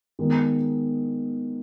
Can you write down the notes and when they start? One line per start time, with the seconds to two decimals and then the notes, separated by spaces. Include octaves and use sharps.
0.19 D#3 G#3 B3